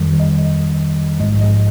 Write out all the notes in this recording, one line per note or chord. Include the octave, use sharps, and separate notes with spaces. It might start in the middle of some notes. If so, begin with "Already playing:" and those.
Already playing: F2 D#3 G3
D#5
A#1 G#2 F3 G#3 D#5
D#5